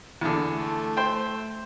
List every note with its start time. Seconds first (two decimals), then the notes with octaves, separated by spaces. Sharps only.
0.21 E2 D3
0.53 A3
0.97 C5 G5